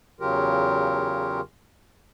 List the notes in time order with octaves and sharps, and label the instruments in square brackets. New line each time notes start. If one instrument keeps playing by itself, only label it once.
[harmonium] E2 C#3 F#3 F4 G4 A#4